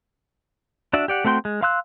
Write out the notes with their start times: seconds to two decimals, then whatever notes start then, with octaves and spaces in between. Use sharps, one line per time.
0.93 D4 F#4 D5 E5
1.08 G4 D5 F#5
1.25 A3 C4 F#4 G5 C6
1.45 G#3
1.63 F5 C6 E6 F#6